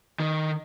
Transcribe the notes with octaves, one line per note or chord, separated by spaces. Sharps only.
D#3